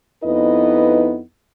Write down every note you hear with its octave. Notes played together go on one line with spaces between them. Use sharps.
F2 B3 D#4 E4 B4 D#5